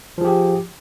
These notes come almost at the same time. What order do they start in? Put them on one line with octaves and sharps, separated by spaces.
F3 G#4 G4